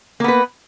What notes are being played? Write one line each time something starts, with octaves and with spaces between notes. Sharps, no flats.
A#3 B3 B4